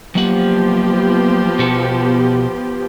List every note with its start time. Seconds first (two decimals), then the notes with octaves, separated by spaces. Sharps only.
0.15 F3 F#3 A#3 B3 G4 F#5
1.59 B2 F#4 A4